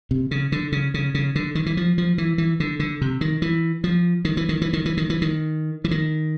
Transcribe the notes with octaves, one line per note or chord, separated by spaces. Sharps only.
C3
C#3
D3
C#3
C#3
C#3
D3
D#3
E3
F3
F3
E3
E3
D3
D3
C3
D#3
E3
F3
D#3
E3
D#3
E3
D#3
E3
D#3
E3
D#3
E3
D#3